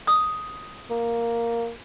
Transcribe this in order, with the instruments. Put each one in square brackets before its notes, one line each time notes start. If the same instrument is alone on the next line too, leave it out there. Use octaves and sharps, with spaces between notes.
[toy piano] D#6
[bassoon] A#3